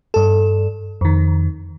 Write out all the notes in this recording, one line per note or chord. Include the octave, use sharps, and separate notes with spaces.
G2 A4
F2 D#3